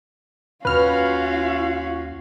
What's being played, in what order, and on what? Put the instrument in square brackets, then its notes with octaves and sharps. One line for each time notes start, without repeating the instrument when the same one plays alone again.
[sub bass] D#2 [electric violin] C#4 F#4 [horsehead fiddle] F4 F5 [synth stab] B4 F6